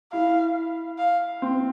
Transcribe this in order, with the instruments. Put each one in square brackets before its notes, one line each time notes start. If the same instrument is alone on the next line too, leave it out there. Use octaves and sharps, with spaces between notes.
[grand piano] E4 [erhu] F5
[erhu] F5
[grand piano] C4